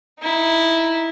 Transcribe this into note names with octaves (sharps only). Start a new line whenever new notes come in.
D#4 E4